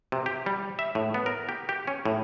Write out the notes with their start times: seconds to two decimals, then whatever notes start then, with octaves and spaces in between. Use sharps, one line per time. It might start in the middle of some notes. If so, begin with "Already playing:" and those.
0.12 C3
0.26 G4
0.46 G3
0.79 E5
0.95 A2
1.14 B3
1.26 A#4
1.49 G4
1.69 G4
1.87 C#4
2.05 A2